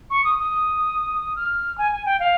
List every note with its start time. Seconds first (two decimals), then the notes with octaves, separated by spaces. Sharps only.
0.10 C#6
0.24 D#6
0.38 D#6
1.36 F6
1.78 G#5
1.92 G#5
2.06 G5
2.20 F5